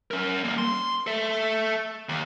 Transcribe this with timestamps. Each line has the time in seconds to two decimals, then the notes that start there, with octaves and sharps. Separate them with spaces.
0.11 C#4 A#4
0.44 G3 A#3
0.58 C6
1.07 A4 E5
2.09 D#2